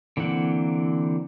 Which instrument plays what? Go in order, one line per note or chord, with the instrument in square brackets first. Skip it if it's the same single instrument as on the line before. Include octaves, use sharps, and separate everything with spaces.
[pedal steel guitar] D3 E3 A#3 C4 F#5